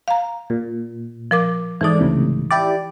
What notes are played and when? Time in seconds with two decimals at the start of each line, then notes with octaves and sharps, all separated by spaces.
0.08 F5 A#5
0.50 A#2
1.31 F3 A#4 D6
1.81 G#2 E3 A3 D#4 D5
1.99 C#2 A2 C3
2.51 E4 G4 D5